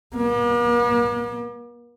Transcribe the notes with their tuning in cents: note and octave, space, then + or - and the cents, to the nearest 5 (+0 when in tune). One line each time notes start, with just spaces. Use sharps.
A#3 +45